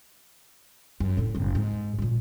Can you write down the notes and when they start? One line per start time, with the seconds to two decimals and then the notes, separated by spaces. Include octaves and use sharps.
1.00 F#2
1.17 F1 A2
1.35 F#1 C4
1.55 G#2
1.99 A#2 G#3